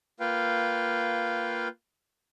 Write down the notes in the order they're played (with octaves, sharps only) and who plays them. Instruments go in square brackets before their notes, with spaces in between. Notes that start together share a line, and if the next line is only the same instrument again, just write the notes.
[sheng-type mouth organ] A#3 F4 B4 F5 G5